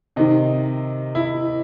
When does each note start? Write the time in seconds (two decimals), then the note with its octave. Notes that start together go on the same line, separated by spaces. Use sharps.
0.16 C3 D#3 D#4
1.15 E4